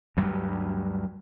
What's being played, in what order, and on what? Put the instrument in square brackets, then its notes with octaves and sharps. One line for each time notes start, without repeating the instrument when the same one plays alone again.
[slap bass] D2 G2 F#3 G3